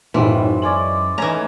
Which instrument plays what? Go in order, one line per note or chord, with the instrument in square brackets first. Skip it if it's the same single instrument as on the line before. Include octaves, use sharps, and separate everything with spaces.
[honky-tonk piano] B1 A2 [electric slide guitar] F#2 E4 [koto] E3 [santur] C4
[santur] G#3 C#4 D5 [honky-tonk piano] F#7
[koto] E3 A#5 [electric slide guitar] A3 [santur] C#4 D#4